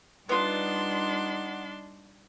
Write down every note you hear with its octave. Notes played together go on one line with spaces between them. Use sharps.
G3 B3 D4 D#4 F4 C6